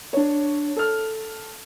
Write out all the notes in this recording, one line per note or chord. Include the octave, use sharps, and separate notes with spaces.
D4 C#5
A4 F6